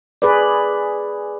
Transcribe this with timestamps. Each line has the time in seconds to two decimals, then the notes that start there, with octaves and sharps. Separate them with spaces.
0.22 G#4 B4 D5